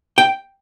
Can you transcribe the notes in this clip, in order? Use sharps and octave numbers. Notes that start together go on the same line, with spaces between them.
G5